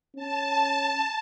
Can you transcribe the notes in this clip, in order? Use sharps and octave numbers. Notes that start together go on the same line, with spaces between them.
C#4 A5